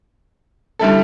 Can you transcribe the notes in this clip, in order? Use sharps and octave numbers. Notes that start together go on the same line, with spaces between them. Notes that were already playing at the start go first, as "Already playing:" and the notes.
D3 G3 E4 A4